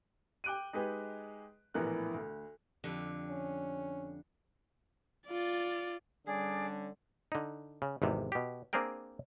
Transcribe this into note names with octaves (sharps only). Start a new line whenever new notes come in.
G5 D6 F#6 D7 D#7
G#3 D#4 G4 G#4 B4 G5
A#1 A2 E3 B3 A#4 F#6
D2
F2 D3 G4
C#4
F4 D5
D3 G3 C#4 D4 G#4 D5
D3 D#4
C#3
G#1 E2 C3
B2 G4
A#3 C4 D4 G#4 A#4 G5